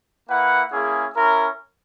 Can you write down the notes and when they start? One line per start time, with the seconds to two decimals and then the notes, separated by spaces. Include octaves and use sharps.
0.29 A#3 E4 B4 F#5
0.71 A#3 C#4 E4 G#4
1.15 C#4 E4 A#4